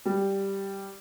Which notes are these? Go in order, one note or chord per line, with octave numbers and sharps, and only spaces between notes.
G3